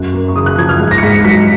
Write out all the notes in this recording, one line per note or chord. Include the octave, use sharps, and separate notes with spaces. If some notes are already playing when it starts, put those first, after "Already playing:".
Already playing: F#2 F#3 F#6
A#3
C#6
C#3 D#6
F#6
F3 G#6
F6
G#2
A#6
C#7
G#2 B6
C#7
F#3 B6